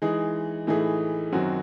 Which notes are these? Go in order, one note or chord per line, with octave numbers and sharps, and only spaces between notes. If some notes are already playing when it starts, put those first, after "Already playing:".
E3 G#3 D#4 G#4
A2 E3 A3 D#4 G#4
F#2 D#3 F#3 C4 F#4